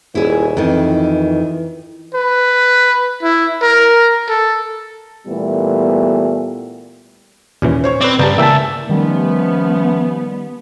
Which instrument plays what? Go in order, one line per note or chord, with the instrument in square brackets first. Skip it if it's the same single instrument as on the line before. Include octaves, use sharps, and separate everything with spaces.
[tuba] D#1 [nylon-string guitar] E4 G#4
[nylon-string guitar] F2 D#3 [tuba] E3
[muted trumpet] B4
E4
A#4
A4
[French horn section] A#2 E3 G3 A3 B3
[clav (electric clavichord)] D#2 A#2 E3 [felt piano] C#4
[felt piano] C5 C#5 C#6
[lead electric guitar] C4 [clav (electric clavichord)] B4 D5
[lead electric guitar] G2 [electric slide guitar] C#3 G4 [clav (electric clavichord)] B3 A5 [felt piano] D5 A#5 G6
[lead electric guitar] C#2 [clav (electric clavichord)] E3 A#3 [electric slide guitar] E5 G5 A5
[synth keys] D#3 G3 [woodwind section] F3 A3 C#4 [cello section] B3